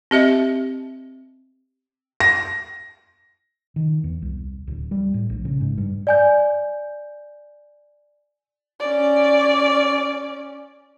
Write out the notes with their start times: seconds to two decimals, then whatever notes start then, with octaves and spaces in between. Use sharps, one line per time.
0.11 C4 G4 D#5 E5
2.20 A#6
3.76 D#3
4.04 E2
4.22 C2
4.67 D1
4.91 G3
5.14 A2
5.30 A#1
5.45 C#3
5.61 G#2
5.78 G2
6.07 D5 G#5 G6
8.80 C#4 D5